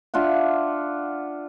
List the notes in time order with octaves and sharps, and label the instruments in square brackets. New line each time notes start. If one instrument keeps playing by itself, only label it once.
[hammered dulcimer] D4 F4 E5 F#5